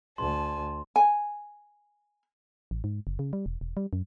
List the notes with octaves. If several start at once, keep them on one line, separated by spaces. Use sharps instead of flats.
D2 G#5 A5 C6
G#5
A1
G#2
F#1
C#3
G3
E1
E1
G3
F#2